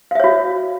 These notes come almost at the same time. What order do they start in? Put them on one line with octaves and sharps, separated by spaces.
F5 E5 C#5 F#4